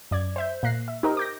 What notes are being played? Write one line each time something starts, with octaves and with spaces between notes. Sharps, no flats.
F#2 D5 G#6
C5 E5 G6
A#2 A#3 F#6 A#6 C7
E5
D#4 G4 A#4 C5 D#5
D6 G6 A#6